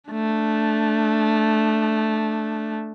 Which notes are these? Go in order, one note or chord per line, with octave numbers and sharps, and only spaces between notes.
A3 D4